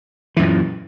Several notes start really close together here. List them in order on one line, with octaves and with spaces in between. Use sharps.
E3 F#2 A#2